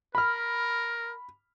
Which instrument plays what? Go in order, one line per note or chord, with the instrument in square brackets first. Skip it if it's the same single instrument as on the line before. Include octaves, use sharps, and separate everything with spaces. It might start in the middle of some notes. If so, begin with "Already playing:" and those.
[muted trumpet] A#4 [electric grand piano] B5 F6